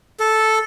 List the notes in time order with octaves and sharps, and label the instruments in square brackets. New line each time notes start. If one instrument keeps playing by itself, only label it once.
[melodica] A4